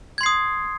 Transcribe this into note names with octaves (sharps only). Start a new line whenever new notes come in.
C6 D#6 G#6 C7